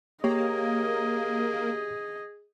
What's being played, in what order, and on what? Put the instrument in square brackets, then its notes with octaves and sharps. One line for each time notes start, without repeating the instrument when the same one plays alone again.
[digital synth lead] A#3 [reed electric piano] G4 C#5 [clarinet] G#4 [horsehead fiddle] D#5